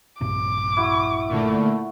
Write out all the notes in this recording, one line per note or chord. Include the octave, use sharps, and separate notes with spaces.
A#1 G2 C3 D6
E4 F#4
A#2 D3 A3